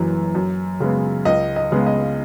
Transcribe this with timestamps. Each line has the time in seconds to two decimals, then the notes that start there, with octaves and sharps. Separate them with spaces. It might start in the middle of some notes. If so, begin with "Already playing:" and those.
Already playing: F#1 F#2 E3
0.35 F#2
0.80 C#3 G#3 B3
1.25 C#2 D#5
1.56 D#5
1.72 C#3 G#3 B3
1.86 D#5